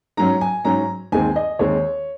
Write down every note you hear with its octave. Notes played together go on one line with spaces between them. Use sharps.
G#2 F#3 C#4 A#5
G#5
G#2 F#3 C#4 A#5
D#2 D#3 G#3 C4 G#5
D#5
D#2 D#3 G#3 C4 C#5